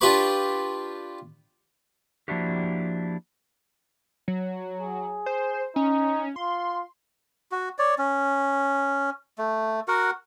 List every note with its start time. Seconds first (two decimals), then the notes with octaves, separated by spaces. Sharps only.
0.01 D4 F4 G4 B4 B5 C#6
2.28 F3 A#3 D4 E4 F#4 G4
4.28 F#3
4.80 G#4
5.26 C5
5.76 C#4 D#4
6.36 F4 C6
7.52 F#4
7.79 C#5 D5
7.99 C#4
9.38 A3
9.88 F#4 A#4 F#5